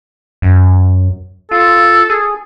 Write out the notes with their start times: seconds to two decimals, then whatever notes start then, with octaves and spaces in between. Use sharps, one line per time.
0.42 F#2
1.51 F4 A4
2.10 G#4